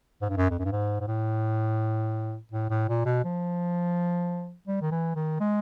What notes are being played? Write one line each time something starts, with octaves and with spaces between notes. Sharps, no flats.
G#2
G2
F#2
F2
F#2
G2
G#2
G#2
A2
A2
A2
A#2
B2
F3
G3
D#3
E3
D#3
G#3